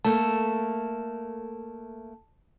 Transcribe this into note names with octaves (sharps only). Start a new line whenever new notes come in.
A3 A#3 A5